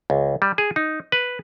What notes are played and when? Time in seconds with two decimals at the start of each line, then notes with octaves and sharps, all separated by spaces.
0.10 C#2
0.42 G3
0.58 G#4
0.76 D#4
1.12 B4